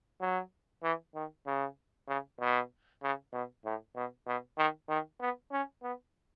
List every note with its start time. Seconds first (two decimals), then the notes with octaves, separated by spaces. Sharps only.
0.21 F#3
0.83 E3
1.15 D#3
1.47 C#3
2.08 C#3
2.40 B2
3.03 C#3
3.33 B2
3.65 A2
3.96 B2
4.27 B2
4.58 D#3
4.89 D#3
5.20 B3
5.52 C#4
5.83 B3